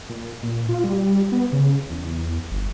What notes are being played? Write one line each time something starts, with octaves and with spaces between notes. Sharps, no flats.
A#2
A#2
F4
G3
B3
C#3
E2
G1